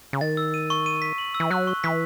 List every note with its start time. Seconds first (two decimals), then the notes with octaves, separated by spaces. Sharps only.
0.13 C#3
0.21 D#3 A6
0.37 E6
0.54 D#7
0.70 C#6
0.86 D#7
1.02 B6
1.18 F#7
1.34 E6
1.40 E3
1.51 F#3 F#6
1.67 C#6
1.84 E3 B6